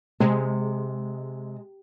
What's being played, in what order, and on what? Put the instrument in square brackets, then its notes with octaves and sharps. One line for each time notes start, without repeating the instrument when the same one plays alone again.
[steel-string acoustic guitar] C3 [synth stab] G#3